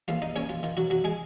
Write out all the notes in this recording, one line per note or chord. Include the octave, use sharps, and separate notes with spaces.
D#2 F4 F5
D#4 D#5
D#2 C#4 C#5
F4
D#3 F4
F#3 F#4
F#3 F#4
G#3 G#4